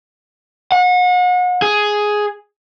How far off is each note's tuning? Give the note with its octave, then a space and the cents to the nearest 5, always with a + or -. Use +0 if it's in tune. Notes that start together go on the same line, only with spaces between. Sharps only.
F#5 -35
G#4 +5